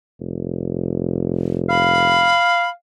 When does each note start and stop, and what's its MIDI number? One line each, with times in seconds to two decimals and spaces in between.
0.20 2.40 29
1.69 2.68 77
1.69 2.70 83